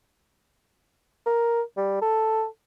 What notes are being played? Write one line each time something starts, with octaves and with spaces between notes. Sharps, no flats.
A#4
G3
A4